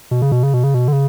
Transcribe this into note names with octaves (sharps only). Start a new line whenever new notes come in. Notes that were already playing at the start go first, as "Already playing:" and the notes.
B2
C#3
B2
C#3
B2
C#3
B2
D3
C#3